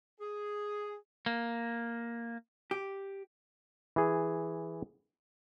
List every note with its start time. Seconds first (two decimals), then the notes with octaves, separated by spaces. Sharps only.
0.21 G#4
1.26 A#3
2.71 G4
3.96 E3 G#4